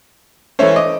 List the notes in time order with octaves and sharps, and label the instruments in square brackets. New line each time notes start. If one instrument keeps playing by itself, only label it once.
[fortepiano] E3 A3 C#4 [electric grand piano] C5 C#5 E5
[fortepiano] D#5 [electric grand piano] D6